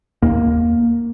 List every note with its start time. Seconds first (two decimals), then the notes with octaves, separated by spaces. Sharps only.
0.22 D#2 A#3